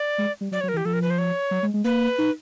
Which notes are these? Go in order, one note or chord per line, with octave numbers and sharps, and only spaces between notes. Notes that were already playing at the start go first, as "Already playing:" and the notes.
Already playing: D5
G#3
G3
F#3 D5
C#5
F#3
A#4
E3
G4
F3 A4
A#4
B4
C5
C#5
F#3
G#3
G#3
A#3 B4
D#4